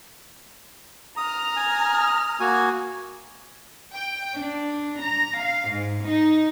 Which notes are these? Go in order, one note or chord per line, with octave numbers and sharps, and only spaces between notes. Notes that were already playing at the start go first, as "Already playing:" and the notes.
A#5 D#6 F6
G#5
A#3 F#4 G#5
G5
D4
A#5
F5
G#2
D#4